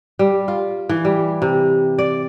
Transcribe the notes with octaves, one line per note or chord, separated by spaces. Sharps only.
G3
F4
E3
G3
C3
D5